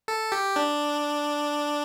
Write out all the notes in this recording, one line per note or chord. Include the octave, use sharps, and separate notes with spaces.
A4
G4
D4